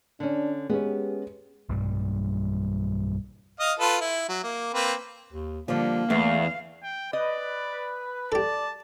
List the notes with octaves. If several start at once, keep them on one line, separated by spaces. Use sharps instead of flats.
D3 C#4 D4
G#3 B3 C#4 G4
B1 G2 G3
D#5 F5
F4 A4 B4
E4
F#3
A#3
A#3 C4 B4
D#2
D3 F3 G3 A#3
E2 A3 B3 E5 F5
G5
B4 D5 D#5
G4 A4 D5 A5